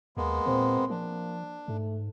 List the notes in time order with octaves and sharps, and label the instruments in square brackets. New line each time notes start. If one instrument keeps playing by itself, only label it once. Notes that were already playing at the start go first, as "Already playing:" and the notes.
[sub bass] D#2 [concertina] G#3 A#3 B3
[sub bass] A#2 [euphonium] C4
[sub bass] F3 [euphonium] A#3 [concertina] D4
[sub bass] G#2 [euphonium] A3